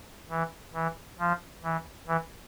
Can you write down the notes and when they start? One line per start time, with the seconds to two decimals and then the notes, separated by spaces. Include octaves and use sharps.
0.30 E3
0.74 E3
1.19 F3
1.64 E3
2.08 E3